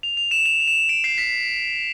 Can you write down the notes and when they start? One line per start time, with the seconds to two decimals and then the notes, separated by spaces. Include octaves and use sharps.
0.03 F7
0.17 F7
0.31 E7
0.46 F7
0.60 F7
0.68 E7
0.89 D7
1.04 C7
1.18 B6